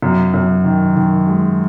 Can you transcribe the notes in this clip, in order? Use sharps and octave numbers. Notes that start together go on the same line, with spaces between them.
F#2
F#2
D#3
D#3
G#3